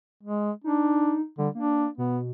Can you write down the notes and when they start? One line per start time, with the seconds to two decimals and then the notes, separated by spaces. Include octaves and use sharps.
0.23 G#3
0.64 D4 D#4
1.38 D3 G3
1.55 A#3 D4
1.98 B2 B3